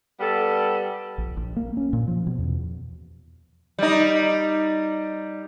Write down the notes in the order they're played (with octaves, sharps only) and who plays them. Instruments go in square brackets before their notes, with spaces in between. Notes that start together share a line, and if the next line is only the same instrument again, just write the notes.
[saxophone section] G3 B3 A4
[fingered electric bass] A#1
A#1
A#3
C#4
A#2
F3
B2
E2
[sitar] G3 D#4